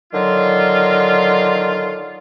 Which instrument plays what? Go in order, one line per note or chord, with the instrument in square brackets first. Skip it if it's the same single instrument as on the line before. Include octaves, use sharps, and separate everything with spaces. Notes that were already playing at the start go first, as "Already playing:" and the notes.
[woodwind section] D3 D#3 F#3 F4